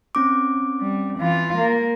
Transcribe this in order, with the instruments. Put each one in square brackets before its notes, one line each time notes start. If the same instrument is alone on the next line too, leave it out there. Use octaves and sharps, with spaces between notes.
[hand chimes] C4 C#4 D6
[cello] G3
E3 F4
A#3